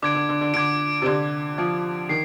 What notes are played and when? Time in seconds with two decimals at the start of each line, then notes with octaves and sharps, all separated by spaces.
0.02 D3 D6 G#6 D7
0.15 D3
0.29 D3
0.41 D3
0.54 D3 D6 G#6 D7
1.02 C3
1.06 D3 D6 G#6 D7
1.58 F3 D6 G#6 D7
2.09 D#3 C7